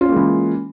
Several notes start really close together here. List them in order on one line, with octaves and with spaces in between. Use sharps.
F4 C#4 A#3 G#3 E3